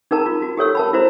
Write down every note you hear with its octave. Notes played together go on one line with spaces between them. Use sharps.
D#4 G#4 A#4 A5 A#5
F4
F#4
G4 A4 C#5 E6
A#4 A5 B5
E4 F#4 C5 A#5